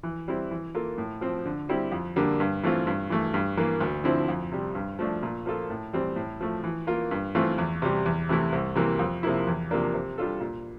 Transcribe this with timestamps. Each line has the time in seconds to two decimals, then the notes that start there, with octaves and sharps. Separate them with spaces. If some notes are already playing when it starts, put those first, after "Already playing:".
0.03 E3
0.28 G3 C4 E4
0.51 E3
0.75 A#3 F4 A4
0.98 A2
1.21 F3 C4
1.46 D3
1.69 G3 C4 E4 G4
1.92 F2
2.16 D3 G3 A#3 D4
2.40 G2
2.63 E3 A3 C4 F4
2.87 G2
3.10 E3 A3
3.34 G2
3.57 E3 A#3
3.80 D2
4.04 D3 F3 C4 E4
4.28 F2
4.52 C3 G3
4.75 G2
4.99 F3 A3 D4
5.23 A#2
5.46 F3 A#3 F4 A4
5.70 A2
5.93 E3 G3 C4
6.16 A2
6.40 F3 A3
6.64 E3
6.87 A#3 F4
7.11 G2
7.35 E3 A3 C4 F4
7.58 E2
7.82 C3 G3
8.06 E2
8.29 C3 E3 A3 E4
8.52 C2
8.75 C3 E3 A#3
8.99 F2
9.23 C3 F3 A#3 E4
9.47 E2
9.71 C3 F3 A#3 D4
9.94 C3
10.18 G3 D4 F4 A4
10.40 A#2